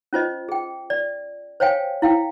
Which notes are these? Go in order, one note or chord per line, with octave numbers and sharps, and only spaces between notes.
C#4 F4 C5 D#5
G#4 G5
D5
C5 C#5 F5 G5 G#5
E4 F5 G5